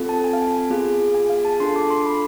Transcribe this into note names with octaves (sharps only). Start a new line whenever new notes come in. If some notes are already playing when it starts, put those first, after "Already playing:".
Already playing: C4 F4 A4
A5
G#5
F5
G#5
B3 F4 G#4
G#5
F5
A5
D4 F4 A4 C6
D6
C6
B5